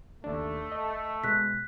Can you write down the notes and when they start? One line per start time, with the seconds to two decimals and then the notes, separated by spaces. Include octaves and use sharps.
0.24 D#2 A3 D4
0.72 D#5
1.24 B2 G#3 F#6 B6